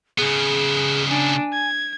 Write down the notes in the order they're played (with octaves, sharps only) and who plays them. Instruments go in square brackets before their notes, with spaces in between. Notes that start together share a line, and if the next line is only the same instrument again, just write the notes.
[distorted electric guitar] C#3 B3 [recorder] G#4
[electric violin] D4 [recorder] G#5
[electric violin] G#6